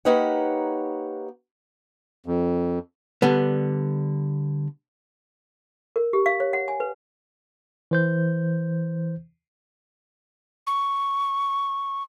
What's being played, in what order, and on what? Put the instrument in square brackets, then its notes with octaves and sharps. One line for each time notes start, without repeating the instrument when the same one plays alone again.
[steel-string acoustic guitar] A#3 D#4 G4 B4 C#5 F#5
[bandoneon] F2
[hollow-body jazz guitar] D3 G3 B3
[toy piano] A#4
G4
F5
C#5
F#5
G#5
B4
[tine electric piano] E3 C5 G6
[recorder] C#6